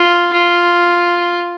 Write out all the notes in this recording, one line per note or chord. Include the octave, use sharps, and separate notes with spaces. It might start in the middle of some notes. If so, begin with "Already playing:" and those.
Already playing: F4
F4